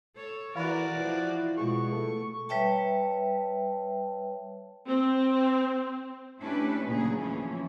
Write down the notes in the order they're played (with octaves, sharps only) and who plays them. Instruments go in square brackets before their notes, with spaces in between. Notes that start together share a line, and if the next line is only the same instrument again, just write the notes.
[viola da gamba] A4 C#5
[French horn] E3 [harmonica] F#4 D5 [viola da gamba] A#4 [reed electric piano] F5 B5
[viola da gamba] F3 [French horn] E4
[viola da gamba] B2 [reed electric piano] G#3 F4 G#4 [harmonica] C#6
[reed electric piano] A3 A4
[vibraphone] G3 B4 C#5 E5 G5 A5
[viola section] C4
[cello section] A3 C#4 D4 E4 G4 B4
D2 A#2 C#3 F#3 G#4
D2 E3 F3 C#4